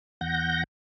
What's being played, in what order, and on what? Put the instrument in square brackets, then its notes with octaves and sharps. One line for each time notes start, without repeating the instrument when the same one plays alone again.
[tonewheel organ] E2 F#5 G6 A#6